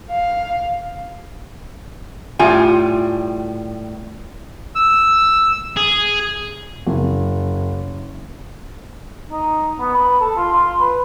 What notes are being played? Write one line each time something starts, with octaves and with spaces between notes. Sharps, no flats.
F5
A2 G3 F4 G#5
E6
G#4
F#1
D#4
B3
B4
A4
F4
F4
B4